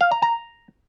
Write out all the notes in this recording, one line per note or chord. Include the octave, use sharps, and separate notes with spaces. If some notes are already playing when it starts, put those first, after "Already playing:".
F5
A#5
A#5